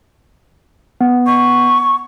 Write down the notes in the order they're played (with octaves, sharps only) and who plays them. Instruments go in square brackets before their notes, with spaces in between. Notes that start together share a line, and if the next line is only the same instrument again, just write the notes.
[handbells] B3
[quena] C#6